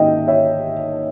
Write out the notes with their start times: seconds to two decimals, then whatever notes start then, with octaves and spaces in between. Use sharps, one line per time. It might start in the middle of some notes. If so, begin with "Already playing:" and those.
Already playing: G#2 D#3 A#3 C#4 D#5 E5 G5
0.28 C#5 E5